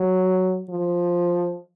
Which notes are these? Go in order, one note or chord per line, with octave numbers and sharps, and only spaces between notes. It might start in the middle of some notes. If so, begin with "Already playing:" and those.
Already playing: F#3
F3